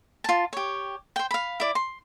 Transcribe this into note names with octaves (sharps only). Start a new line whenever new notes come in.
F4 A5
G4 C#5
C5 G5
F5 B5
E4 D5
C6